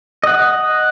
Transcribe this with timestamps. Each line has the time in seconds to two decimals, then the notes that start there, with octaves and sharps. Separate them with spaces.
0.24 D#5 F#5